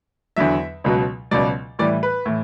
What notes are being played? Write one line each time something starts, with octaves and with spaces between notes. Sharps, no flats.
E2 D3 F#3 E5
C#2 B2 F#3
C#2 B2 F#3 D5
A2 E3 G3 D5
B4
A2 E3